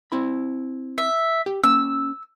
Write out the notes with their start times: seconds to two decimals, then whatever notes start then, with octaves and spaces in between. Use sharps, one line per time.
0.12 C4 E4 B5
0.98 E5
1.46 G4
1.64 A#3 C#4 E6